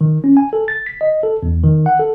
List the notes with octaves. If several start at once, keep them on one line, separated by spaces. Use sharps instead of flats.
D#3
C#4
G#5
A4
A6
B6
D#5
A4
E2
D#3
F#5
A4